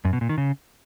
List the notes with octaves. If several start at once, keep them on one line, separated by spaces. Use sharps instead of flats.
F#2
B2
A#2
D#3
C#3